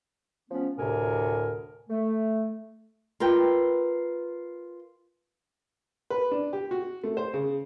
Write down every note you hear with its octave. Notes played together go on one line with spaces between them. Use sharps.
F3 A3 B3 C#4
D2 A2 C3 A#4 G#5
A3
F4 A#4 B4 G5
B4
D4
G4
F#4
A3
C5
C#3